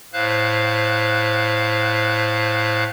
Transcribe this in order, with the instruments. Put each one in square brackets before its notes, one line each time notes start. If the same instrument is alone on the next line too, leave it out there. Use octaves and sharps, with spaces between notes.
[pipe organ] A2 C5 F5 F#6